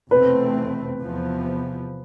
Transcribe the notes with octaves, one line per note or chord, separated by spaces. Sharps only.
F1 E2 B2 A3 C4 B4
E2 C3 F3 B3